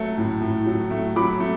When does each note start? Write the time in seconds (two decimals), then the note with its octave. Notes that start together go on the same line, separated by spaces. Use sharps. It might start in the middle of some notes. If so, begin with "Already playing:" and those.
Already playing: F#3 A3
0.18 A2
0.41 A2
0.66 F#3
0.91 A3
1.16 F#3 B5 D6
1.40 A3